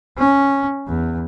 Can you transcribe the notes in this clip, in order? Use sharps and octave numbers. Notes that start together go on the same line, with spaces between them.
C#4
E2